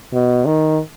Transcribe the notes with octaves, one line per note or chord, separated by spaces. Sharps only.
B2
D#3